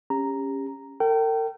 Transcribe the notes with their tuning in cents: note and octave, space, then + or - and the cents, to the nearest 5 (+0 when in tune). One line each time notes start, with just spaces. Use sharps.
C#4 -10 G4 +30 A#5 +0
A#4 -45 G5 -25